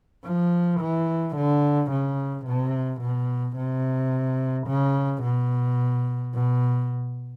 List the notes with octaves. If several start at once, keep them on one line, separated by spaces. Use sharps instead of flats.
F3
E3
D3
C#3
C3
B2
C3
C#3
B2
B2